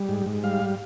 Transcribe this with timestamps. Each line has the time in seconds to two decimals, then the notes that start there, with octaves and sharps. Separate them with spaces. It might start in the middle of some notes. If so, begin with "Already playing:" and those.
Already playing: G3
0.09 G#2
0.26 G#2
0.44 G3 F5